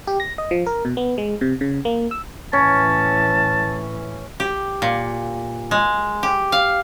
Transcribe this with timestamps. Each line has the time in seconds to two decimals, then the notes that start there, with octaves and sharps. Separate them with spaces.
0.07 G4
0.20 A#6
0.38 D#5
0.51 F3
0.66 A#4
0.85 B2
0.97 B3
1.18 G#3
1.41 C3
1.61 C#3
1.85 A#3
2.11 E6
2.53 A2 E3 C#4 A5
4.40 G4
4.82 A#2
5.71 G#3
6.23 G4
6.52 F5